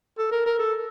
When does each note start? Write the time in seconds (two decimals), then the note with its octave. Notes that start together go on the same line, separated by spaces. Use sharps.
0.18 A4
0.32 A#4
0.46 A#4
0.59 A4